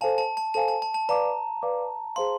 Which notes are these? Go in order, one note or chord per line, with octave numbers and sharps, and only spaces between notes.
A4 C5 F5 G#5 A5
A5
A5
A4 C5 F5 G#5 A5
A5
A5
A5
B4 D5 F5 A5 A#5 D6
B4 D5 F5 A5 D6
G#4 C5 F5 C6